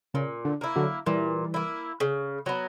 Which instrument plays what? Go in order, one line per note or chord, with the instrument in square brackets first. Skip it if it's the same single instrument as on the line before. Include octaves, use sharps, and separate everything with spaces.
[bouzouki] A#2 [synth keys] C#3
[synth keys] D3
[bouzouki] A#3 E4
[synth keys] D3 F#3
[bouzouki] A#2 [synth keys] E3 G3
[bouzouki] A#3 E4
C#3
F#3 B3